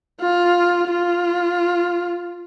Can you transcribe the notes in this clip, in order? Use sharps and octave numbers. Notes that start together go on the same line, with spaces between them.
F4
F4